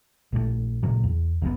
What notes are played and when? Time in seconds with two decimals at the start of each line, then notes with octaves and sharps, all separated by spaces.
0.33 A#1 A2 E3 A3
0.83 A#2 C#3 F#3
1.04 E2
1.42 F#1 F#2 B2 B3